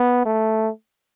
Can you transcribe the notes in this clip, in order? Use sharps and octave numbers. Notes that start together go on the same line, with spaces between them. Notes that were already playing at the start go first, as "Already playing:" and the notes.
Already playing: B3
A3